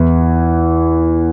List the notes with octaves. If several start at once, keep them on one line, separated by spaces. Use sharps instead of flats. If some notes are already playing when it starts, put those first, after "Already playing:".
Already playing: E2 E3